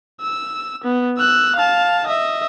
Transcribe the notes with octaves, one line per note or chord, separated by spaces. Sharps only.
E6
B3
E6 F#6
F5 A5
D#5 E5